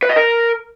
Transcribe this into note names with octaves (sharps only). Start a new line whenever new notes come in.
B4
D#5
A#4